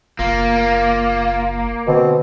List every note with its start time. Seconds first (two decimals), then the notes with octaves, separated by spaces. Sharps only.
0.19 F#1 A#3 F4
1.88 B2 D3 C4